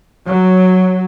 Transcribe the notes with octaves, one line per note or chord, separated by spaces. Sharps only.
F#3